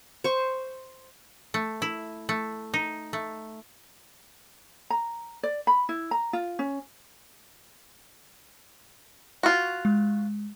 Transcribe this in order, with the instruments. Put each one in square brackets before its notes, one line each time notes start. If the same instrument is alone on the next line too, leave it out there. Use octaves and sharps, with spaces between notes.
[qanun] C5 C#6
[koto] A3
E4
A3
D#4
A3
[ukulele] A#5
D5
B5
E4
A#5
F4
C#4
[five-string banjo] F4 F#4 [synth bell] C#6
[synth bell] G#3